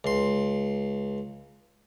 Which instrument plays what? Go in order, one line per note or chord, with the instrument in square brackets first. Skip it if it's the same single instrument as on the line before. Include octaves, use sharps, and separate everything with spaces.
[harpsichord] C#2 C6